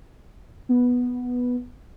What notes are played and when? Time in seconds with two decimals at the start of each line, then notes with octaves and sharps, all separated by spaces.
0.69 B3